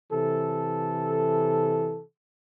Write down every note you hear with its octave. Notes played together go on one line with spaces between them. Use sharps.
C3 E3 A4